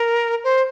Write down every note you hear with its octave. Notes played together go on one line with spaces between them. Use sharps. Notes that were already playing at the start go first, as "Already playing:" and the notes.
Already playing: A#4
C5